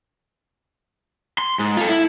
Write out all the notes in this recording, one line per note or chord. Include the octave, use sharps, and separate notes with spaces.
C6
G#2
F4 A4
E4